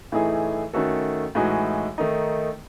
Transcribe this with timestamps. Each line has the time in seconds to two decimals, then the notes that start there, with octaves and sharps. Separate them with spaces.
0.12 A2 E3 A3 D#4 G#4
0.74 D#3 A3 C#4 F#4 A4
1.35 A2 E3 G#3 D#4 F#4
1.98 D#3 A3 D#4